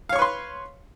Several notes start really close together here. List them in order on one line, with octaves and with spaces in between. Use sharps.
F5 C#5 C#6 B4 C6